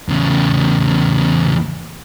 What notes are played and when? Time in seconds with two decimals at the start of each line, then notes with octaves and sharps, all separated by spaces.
0.09 E2 C#3